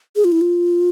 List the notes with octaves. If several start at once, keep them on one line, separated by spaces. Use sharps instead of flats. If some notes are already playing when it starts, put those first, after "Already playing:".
G#4
F4
E4
F4